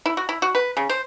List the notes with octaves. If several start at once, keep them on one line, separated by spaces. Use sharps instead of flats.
E4
F#4
E4
F#4
B4
C#3
C5